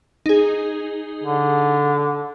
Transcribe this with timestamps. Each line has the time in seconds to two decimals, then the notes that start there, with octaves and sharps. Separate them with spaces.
0.26 D#4 G#4
1.23 D3